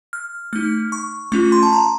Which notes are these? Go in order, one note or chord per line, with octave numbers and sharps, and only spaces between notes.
F6
A3 D#4 F6
C#6
A3 C#4 F4 C#6
C6
A5
A#5